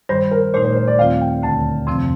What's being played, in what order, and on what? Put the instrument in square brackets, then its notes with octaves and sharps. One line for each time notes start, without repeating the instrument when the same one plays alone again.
[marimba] G2 D#3 G3 [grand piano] C5
[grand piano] A#4
[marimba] A#2 A3 D#4 [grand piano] C5
[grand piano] C5
C5
D5
[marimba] D#2 D#3 A3 C4 F4 [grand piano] F5
[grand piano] G5
[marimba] D2 D3 A3 [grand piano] A5
[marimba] F2 C3 F3 C4 [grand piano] C6